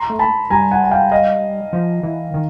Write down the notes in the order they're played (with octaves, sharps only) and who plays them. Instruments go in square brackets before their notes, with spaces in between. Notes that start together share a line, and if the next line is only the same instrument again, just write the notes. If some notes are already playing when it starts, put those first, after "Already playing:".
Already playing: [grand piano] A#5 C6
[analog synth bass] A3
[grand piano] A5 B5
[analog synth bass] G3 [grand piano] G#5 A#5
[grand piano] F#5 G#5
G#5
F5 G5
D#5 F5
[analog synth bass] F3
E3
D#3